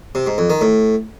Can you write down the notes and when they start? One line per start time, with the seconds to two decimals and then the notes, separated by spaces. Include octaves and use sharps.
0.15 C3
0.27 G#2
0.38 F2
0.50 D#3
0.61 A2